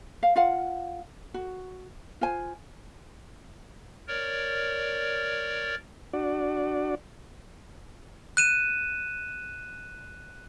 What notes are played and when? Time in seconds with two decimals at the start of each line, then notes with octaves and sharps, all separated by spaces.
0.23 F5
0.36 F4 F5 F#5
1.34 F#4
2.21 F4 C5 G#5
4.08 A#4 C#5 D5
6.13 D4 F#4 D5
8.37 F#6 D#7 E7